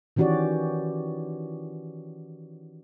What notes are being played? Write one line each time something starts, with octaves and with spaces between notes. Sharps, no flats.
D#3 E3 C#4 F#4 G4 D5